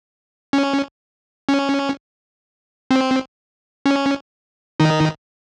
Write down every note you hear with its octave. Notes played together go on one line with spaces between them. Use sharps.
C#4
C#4
C4
C#4
D#3 D#4